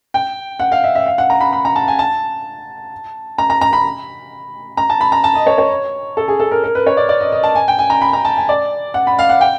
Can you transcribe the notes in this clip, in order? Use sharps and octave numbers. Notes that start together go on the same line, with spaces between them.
G5
F#5
F5
E5
E5
F5
F#5
A#5
B5
B5
A#5
A5
G#5
A5
A#5
A#5
A#5
B5
A#5
A5
B5
A#5
A5
D#5
C#5
C#5
A4
G#4
A4
A#4
A#4
B4
C#5
D5
D5
D#5
D#5
A5
G#5
G5
G#5
A#5
B5
A#5
A5
G#5
D5
F#5
B5
F5
F#5
G5